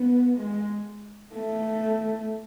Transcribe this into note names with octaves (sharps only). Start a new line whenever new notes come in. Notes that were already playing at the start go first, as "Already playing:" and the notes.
Already playing: B3
G#3
A3